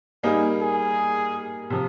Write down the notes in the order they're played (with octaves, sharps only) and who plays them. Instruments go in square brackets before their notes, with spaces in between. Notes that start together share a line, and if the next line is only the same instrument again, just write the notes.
[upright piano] G3 A#3 D#4 [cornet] G#4
[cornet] G#4
[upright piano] C3 F3